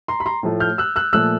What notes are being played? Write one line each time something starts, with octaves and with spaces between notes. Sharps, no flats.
A#5 C6
B5
A#5 C6
A2 F3 A3
F6 G6
E6 F#6
E6 F#6
A#2 F3 A3 E6 F#6